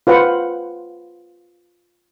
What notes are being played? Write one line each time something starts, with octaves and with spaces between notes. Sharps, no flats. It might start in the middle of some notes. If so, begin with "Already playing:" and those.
F4 B4 C5 F#5